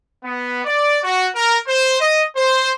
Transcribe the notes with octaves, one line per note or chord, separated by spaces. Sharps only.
B3
D5
F#4
A#4
C5
D#5
C5